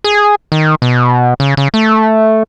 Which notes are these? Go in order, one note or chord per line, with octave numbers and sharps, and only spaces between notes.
G#4
D#3
B2
C#3
C#3
A3